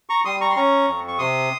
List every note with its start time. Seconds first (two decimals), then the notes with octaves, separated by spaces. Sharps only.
0.09 A#5 C#6
0.25 G3 C6 D#6
0.41 A#5 C#6
0.50 C6
0.56 C#4 A#5 C#6
0.88 F2
1.08 C#6
1.19 C3 C6 D#6